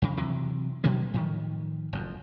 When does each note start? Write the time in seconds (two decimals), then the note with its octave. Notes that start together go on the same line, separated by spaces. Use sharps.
0.02 F2 C#3
0.17 C3 E3 F#3
0.84 B2 F#3 G3 A#3
1.14 A2 D#3 F3
1.93 F#1 F2